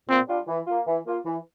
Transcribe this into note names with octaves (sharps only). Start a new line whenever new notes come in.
A#2 C4
G3 D4 F4
E3
A#3 F4
E3
A#3 F4
E3